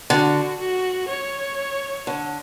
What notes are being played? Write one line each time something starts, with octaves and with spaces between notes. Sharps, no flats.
D3 F#4
F#4
C#5
D3